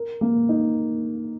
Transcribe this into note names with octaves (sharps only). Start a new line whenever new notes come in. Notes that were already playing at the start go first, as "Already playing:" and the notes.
Already playing: A#4
A#3
D#4